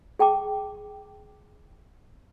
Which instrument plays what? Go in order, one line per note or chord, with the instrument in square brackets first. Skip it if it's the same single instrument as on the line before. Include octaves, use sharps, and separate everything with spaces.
[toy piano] G#4 G5 A5 D6